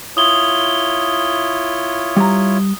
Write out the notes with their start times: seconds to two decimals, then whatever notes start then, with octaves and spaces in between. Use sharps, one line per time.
0.17 E4 F4 C#5 D#6 G7
2.16 G3 A#5